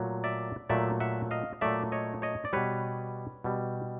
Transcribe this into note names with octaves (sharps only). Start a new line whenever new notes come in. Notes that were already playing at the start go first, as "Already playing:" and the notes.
Already playing: A#2 F#3 A3
D5 E5
A#2 F#3 A3 D5 E5
E5 F#5
D#5 F5
A#2 F#3 A3 D5 E5
C#5 D#5
C#5 D#5
D5
B2 G3 B4 C#5
B2 G3